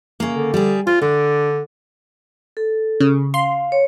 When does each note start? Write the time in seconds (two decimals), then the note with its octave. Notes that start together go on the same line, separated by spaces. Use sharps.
0.20 C#3 A#3
0.35 D3
0.54 G3 G#4
0.87 F4 C5
1.01 D3 D4
2.57 A4
3.00 C#3
3.34 F5 C6
3.72 C#5